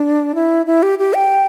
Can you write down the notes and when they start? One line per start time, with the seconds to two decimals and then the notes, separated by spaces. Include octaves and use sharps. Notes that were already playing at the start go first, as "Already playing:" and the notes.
Already playing: D4
0.35 E4
0.66 E4
0.83 G4
0.99 G4
1.14 G5